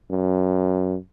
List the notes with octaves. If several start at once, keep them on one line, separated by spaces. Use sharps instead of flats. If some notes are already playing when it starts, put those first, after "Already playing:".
F#2